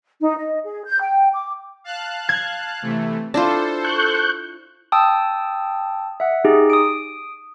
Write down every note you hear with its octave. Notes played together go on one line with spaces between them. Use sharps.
D#4
D#5
G#4
G6
G5
D6
F5 A5 F#6
G#6
C3 E3 A3
D4 E4 F4 A4 C5
C#6 F#6 G6
G5 A5 D#6 E6
E5 F#5
D#4 G4 G#4
D#6 D7